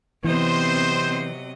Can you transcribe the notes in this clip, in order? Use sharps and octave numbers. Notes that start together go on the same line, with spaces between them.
C3 E3 F#3 B3 C4 C5 D#5